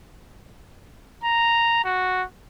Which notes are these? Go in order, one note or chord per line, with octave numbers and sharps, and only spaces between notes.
A#5
F#4